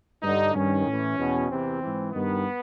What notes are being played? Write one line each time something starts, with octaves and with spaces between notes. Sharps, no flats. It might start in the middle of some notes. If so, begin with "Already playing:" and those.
G2 D3 D#4
G2 D#3 C#4
A2 E3
E2 B2
E2 C3 E3 C4
G#2 E3
G2 D#3 B3